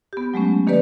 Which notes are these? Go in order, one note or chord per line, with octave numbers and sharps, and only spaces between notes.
B3 G4
F#3 G#3 A3 C#4
D#3 A#3 G4 B4 D5